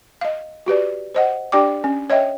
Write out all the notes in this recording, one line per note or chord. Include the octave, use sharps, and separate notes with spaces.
D#5 F5
F#4 G4 B4 D5
C5 D#5 F#5
D4 G4 D5 G5 D6
C#4
C#5 D#5 E5 G5